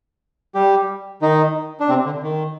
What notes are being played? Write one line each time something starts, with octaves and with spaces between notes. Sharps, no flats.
G3 G4
D#3 D#4
D4
C3 C4
D3
D#3